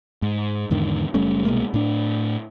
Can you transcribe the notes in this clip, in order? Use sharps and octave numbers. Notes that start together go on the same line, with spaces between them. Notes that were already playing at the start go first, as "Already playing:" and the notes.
G#2
E2 G#2 D3 D#3
F#1 G3 A3 C#4
C2 B2 G#3 A#3
A2 D4